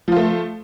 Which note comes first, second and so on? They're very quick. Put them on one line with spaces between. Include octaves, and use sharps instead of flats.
F3 F4 A3